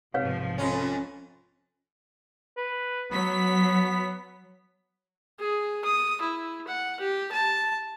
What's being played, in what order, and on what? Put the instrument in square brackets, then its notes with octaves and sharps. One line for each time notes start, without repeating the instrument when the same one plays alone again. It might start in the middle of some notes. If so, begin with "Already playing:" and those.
[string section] B1 G#2 F3 [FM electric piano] C3 [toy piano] B4 C#5 F5
[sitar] F2 C#4
[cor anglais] B4
[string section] F#3 B6 [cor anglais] B3
[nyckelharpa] G#4
D#6
E4
F#5
G4
A5